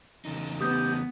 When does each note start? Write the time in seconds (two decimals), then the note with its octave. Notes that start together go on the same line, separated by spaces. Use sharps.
0.25 E2 C#3 D#4
0.61 B3 G4 D#6 G6